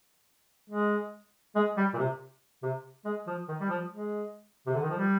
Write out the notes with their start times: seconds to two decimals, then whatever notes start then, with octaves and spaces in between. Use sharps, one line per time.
0.70 G#3
1.56 G#3
1.77 G3
1.94 A#2
1.98 C3
2.63 C3
3.05 G#3
3.27 F3
3.48 D#3
3.60 G3
3.69 F3
3.91 G#3
4.66 C3
4.75 D3
4.82 D#3
4.90 F3
4.98 G3